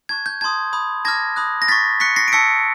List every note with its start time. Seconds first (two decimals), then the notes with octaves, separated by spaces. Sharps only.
0.09 A5 C#6 F#6 G#6
0.26 G6
0.41 A5 C6 D#6 G#6
0.73 B5 D#6 G6
1.05 A5 D6 F6 G#6 A#6
1.36 B5 D#6 F#6
1.62 A#6
1.68 F6 A6 B6
1.72 C#6
2.00 C#6 F#6 B6 C#7
2.16 A#6 C7
2.28 D7
2.32 A5 C#6 E6 G6 B6 C#7